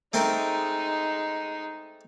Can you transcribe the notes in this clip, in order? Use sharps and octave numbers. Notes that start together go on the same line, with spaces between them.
G#3 A3 C4 D#4 A#4